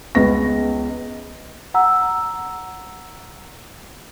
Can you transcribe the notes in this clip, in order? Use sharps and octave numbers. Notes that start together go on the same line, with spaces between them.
C#2 B3 A#6
F#5 A#5 E6